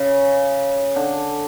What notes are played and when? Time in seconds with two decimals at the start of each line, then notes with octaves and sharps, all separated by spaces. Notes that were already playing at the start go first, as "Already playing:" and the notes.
Already playing: C#3
0.96 D3